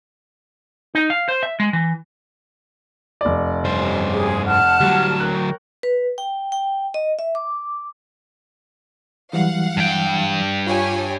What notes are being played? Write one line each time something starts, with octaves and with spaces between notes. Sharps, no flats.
D#4
F5
C5
E5
G#3
E3
F1 D5
G2 C#4 G4 C5
G#4
F#5 A5 F6
D2 F#3 G3
A#4 C#5 G5 F#6
B4
G5
G5
D#5
E5
D6
E3 F#3 G3 F5 F#5
G2 G5
F4 G4 C#5 G#5